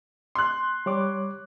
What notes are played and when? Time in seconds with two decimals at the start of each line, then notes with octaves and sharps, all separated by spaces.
0.35 C6 F#6
0.86 G3 C#5 D6